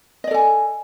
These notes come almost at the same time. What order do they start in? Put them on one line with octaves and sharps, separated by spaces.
D#5 D5 A4 G#5